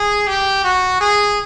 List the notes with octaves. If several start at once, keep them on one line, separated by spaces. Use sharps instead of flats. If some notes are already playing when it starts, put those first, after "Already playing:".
Already playing: G#4
G4
F#4
G#4